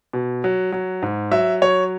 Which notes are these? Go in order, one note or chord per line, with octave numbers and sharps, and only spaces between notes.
B2
F#3
F#3
G#2
F#3 E5
F#3 C#5